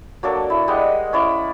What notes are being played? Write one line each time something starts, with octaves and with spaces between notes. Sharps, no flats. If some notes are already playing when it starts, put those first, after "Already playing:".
F#3 A#3 D4 A4
E4
G3 G#3 D#5 F#5
C#4 E4 D5